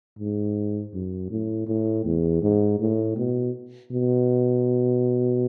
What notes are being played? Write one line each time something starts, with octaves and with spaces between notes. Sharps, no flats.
G#2
F#2
A2
A2
E2
G#2
A2
B2
B2